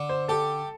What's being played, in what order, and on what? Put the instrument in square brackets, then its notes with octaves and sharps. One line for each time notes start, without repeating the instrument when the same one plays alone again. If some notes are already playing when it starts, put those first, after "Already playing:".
Already playing: [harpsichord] D3
[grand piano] C5
[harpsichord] G4 [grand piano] A4